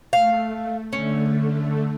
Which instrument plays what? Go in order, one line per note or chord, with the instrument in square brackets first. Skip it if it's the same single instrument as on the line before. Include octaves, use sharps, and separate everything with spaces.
[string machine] A3 [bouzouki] F5
[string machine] D3 A3 [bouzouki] C#4